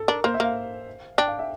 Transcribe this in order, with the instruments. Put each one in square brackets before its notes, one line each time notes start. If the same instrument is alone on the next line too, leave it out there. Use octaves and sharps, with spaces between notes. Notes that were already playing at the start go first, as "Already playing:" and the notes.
Already playing: [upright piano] A4
[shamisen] D4 [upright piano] A#4
[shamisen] A#3 [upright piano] C5
[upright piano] E5
[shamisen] A#3 [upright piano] F5
[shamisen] D4 [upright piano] G5
[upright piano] F5
E5